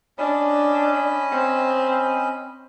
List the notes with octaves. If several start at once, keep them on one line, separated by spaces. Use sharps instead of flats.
C#4 D4 D#5 B5
C4